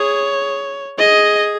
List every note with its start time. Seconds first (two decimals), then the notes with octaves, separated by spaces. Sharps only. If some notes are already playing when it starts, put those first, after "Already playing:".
Already playing: G#4 C#5
0.98 G#4 D#5